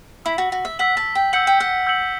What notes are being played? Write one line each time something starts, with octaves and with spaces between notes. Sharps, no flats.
E4 E6 B6 F#7
F#4
F#4
E5
F#5 E6 B6 F#7
A5
G5
F#5 E6 G6 C#7 F#7
G5
F#5
E6 G6 C#7 F#7